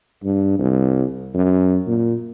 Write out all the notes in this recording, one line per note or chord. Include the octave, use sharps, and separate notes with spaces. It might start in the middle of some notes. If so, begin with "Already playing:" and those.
G2
C2
F#2
A#2